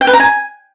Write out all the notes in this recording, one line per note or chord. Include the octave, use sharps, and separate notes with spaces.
G5
B4
A#5
G#5